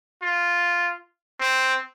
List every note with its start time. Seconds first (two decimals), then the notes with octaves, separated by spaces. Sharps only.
0.22 F4
1.40 C4